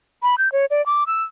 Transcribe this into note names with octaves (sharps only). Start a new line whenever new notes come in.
B5
G6
C#5
D5
D6
E6